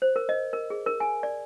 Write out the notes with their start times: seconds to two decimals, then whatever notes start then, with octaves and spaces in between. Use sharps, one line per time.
0.02 C5
0.16 A#4
0.29 D#5
0.53 A#4
0.70 G#4
0.86 A#4
1.00 G#5
1.23 D5